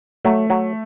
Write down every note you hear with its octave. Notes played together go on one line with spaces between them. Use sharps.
F#3 A3
F#3